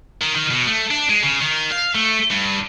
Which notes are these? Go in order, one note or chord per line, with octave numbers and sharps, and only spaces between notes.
D#3
D#3
B2
A3
D4
G#3
C#3
D#3
F5
A3
G2